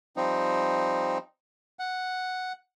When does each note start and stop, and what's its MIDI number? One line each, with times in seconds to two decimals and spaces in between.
0.17 1.18 53
0.17 1.18 55
0.17 1.18 60
0.17 1.18 63
1.79 2.53 78